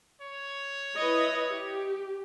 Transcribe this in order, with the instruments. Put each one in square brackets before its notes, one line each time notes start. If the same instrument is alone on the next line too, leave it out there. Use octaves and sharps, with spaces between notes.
[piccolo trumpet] C#5
[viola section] E4 B4 D#5
G4